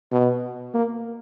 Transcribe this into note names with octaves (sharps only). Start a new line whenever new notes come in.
B2
A#3